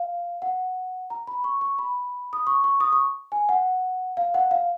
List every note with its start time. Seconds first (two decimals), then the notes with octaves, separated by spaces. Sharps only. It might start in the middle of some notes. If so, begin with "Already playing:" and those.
Already playing: F5
0.42 F#5
1.10 A#5
1.27 B5
1.44 C#6
1.61 C#6
1.79 B5
2.33 D#6
2.47 C#6
2.64 C#6
2.80 D#6
2.92 C#6
3.32 G#5
3.49 F#5
4.17 F5
4.34 F#5
4.51 F5